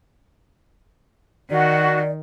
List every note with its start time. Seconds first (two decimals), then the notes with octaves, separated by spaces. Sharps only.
1.50 D#3 F#4 D5